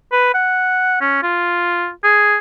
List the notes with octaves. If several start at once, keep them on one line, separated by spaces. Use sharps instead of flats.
B4
F#5
C#4
F4
G#4